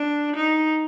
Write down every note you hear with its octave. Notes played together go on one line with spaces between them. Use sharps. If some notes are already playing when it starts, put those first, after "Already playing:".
Already playing: D4
D#4